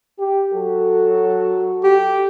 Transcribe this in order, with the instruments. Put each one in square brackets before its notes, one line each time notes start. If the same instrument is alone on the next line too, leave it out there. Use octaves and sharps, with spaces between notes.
[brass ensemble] G4
F#3 F#4 A4
[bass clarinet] G4